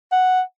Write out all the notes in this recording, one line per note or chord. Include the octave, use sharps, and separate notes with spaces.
F#5